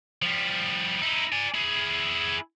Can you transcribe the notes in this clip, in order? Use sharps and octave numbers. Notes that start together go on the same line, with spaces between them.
F3 G3
D#4 E4
D5 G#5
E4 G#4